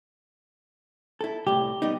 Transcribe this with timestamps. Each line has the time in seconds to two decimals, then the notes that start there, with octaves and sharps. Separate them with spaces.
1.21 E4 A4
1.47 C2 A2 G4
1.82 G3 B3 D#4